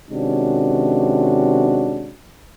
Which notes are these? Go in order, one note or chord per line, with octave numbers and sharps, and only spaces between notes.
C3 D#3 G#3 C#4 D4 F#4